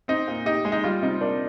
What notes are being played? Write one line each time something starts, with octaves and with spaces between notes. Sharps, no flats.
C4 D#4
A#2
D#4 G4
G#3
D#4
G3 F4
C3 D#4
A#3 D4